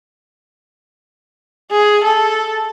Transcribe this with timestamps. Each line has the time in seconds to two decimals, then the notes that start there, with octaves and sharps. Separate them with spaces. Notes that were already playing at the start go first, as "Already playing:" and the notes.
1.72 G#4
2.04 A4